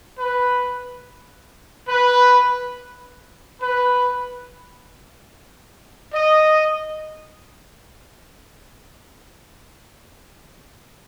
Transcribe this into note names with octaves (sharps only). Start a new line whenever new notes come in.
B4
B4
B4
D#5